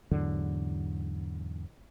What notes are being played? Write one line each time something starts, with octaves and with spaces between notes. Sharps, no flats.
E2 G#2 D3 F#3